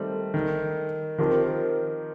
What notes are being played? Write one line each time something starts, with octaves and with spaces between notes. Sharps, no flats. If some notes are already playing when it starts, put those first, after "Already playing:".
Already playing: D#3 G3 A3 C4
D#3
D#3 F3 C4 G4 A#4